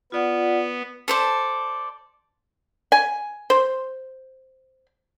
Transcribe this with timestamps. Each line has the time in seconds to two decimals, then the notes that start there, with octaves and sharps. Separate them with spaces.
0.12 B3 F4 D5 F#5
1.08 A4 C5 D5
2.92 G#5
3.50 C5